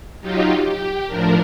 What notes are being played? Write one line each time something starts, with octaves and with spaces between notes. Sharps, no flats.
F#3 D#4 F4 G4
G4
A2 F3 D4 A#4